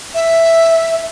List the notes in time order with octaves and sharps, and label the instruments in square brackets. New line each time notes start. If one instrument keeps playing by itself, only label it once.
[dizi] E5